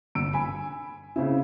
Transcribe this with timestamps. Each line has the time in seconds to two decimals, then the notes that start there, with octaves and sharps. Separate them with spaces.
0.15 G1 E6 D7
0.33 G#5 B5
1.16 C#3 C4 E4